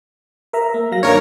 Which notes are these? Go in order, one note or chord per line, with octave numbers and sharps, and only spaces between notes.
A#4 E5 A#5
A#3
F#3 F5 A#6
G2 D#3 D4 A#4 C#5